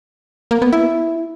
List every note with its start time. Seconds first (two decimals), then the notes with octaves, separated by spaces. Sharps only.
0.51 A#3
0.62 B3
0.73 E4